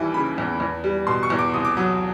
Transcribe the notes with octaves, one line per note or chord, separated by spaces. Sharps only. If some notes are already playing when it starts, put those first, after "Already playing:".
Already playing: D#2 E3 G3
C#3 B5
E2
E2
G3
B2 C6
C#6
E2
D6
C2 D#6
D6
F#3 D#6